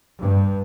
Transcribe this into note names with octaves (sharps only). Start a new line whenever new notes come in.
G2